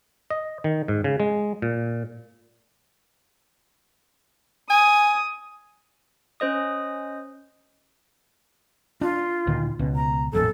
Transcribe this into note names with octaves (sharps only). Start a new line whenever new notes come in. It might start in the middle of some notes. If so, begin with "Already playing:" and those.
D#5
D#3
G#2
C#3
G#3
A#2
G#5 D#6
C#4 C5 D#5 D#6
D4 F4
D2 A#2 D#3
C#2 B2
A#5
A1 F2 A#2 A4